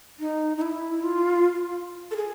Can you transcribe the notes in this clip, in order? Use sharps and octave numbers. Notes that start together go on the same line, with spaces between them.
D#4
D#4
E4
F4
A4
G#4